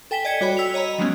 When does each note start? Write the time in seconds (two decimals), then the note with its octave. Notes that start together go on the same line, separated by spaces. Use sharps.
0.11 A4 G5 G#5 B6 E7 G7
0.25 D5 D#5 G#6 B6 C#7
0.41 G3 F#4 C#5 G5 B5
0.57 G5 E6 B6 F7
0.74 C#5 D#5 A#5 B5
0.98 F3 F#3 G#3 A#3 B3 C#4